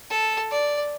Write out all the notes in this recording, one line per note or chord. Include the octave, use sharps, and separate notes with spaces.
A4
D5